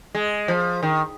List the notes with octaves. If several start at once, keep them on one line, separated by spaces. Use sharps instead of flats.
G#3
F3
D#3